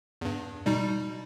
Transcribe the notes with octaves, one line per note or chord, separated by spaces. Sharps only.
E2 G2
B2 G3 D#4